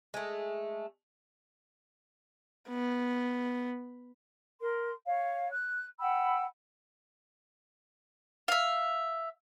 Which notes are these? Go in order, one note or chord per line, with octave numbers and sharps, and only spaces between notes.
G#3 A3
B3
A#4 C6
C#5 F5
F#6
F#5 G5 B5 E6
E5 F5